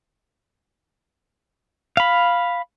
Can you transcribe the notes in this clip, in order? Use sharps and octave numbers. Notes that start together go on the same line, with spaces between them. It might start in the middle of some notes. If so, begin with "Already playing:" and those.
F5 B5